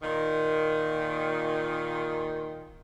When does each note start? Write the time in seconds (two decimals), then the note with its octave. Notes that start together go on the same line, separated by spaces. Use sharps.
0.02 A#2 D#3